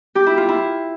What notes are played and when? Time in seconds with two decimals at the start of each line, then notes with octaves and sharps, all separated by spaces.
0.15 G4
0.26 E4
0.38 F4
0.49 E4